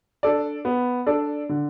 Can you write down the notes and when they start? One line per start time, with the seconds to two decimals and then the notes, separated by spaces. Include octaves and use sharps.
0.23 D4 A4 D5
0.65 B3
1.06 D4 A4 D5
1.49 D3